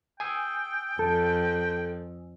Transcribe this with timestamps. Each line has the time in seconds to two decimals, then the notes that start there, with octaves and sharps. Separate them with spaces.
0.20 G5 G#5 D#6 E6
0.99 F2 A4